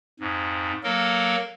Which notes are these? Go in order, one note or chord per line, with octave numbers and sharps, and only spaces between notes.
F2 G#2
F#3 A#3 A4 A#4